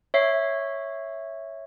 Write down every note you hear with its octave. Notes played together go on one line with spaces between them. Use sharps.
C#5 E5 C7